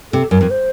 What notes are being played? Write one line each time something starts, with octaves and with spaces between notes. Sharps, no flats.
C3 A4
F#2 A#4
F2
C5